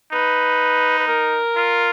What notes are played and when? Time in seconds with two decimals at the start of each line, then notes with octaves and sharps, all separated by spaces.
0.12 D#4 B4
0.99 B4
1.08 A#4
1.56 F4